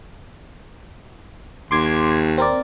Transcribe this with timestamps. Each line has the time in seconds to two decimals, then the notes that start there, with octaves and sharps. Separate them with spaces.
1.71 D#2 C6 D6 G#6
2.38 C4 A#4 D5